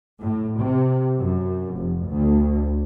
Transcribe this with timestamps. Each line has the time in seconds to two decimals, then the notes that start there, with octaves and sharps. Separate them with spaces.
0.21 A2
0.59 C3
1.18 F#2
1.76 F1
2.08 D2